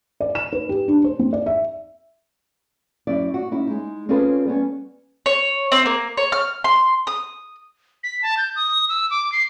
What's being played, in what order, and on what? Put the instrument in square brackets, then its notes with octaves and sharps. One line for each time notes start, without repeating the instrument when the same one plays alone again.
[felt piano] D5
E7
B4
G4
D4
C5
C4
D5
E5
[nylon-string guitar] F#2 E4 D5
F#4
C#4 D#4 E4
G#3 D#4
C4 C#4 F4 G#4 A4 B4
G3 B3 C#4
[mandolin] C#5
C4
A#3
C#5
F6
C6
D#6
[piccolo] B6
A5
G6
D#6
E6
D6
C7